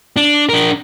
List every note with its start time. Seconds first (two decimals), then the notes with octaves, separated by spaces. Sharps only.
0.17 D4
0.49 D4 A#4